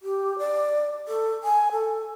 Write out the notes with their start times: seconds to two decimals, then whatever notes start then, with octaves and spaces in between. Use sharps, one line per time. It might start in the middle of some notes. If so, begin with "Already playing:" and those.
0.02 G4
0.39 D5
1.08 A4
1.43 G#5
1.72 A4